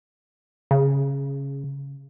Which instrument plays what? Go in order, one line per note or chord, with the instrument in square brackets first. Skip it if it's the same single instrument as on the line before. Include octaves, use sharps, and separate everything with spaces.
[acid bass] C#3